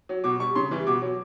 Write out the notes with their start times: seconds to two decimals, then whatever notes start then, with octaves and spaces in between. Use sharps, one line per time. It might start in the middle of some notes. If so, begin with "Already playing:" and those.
0.09 F#3
0.24 B2 D6
0.40 G3 C#6
0.55 C#3 C6
0.71 E3 G3
0.86 B2 D6
1.02 F#3